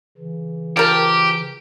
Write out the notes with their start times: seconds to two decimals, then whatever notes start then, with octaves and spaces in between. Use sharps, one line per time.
0.18 C#3 E3
0.77 F3 G4 A#4